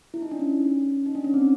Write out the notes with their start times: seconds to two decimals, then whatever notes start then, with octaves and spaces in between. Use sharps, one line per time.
0.14 E4
0.22 D#4
0.31 D4
0.39 C#4
1.06 D#4
1.15 D4
1.24 C#4
1.34 C4